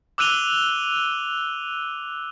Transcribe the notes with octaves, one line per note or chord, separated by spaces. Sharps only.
D6 E6 F#6 D#7 F7 G7